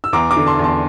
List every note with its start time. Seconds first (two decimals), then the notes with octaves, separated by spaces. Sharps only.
0.04 E6
0.13 E2 A#5 D6
0.31 A#5 D6
0.36 D3
0.47 A5 C6
0.59 E2 A5 C6